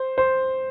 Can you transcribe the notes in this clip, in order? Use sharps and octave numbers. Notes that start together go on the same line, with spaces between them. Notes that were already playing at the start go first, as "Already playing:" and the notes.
Already playing: C5
C5